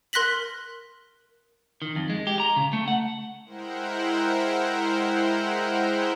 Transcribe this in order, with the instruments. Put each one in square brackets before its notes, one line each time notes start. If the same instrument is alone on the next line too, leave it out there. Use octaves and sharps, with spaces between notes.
[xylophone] A#4 C6 F#6 A#6 B6 F#7
[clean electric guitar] D#3
F2
G#3
G4
A#5
C#3
A3
F#5
[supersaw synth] G#3 E4 A#4 C5 F#5 G5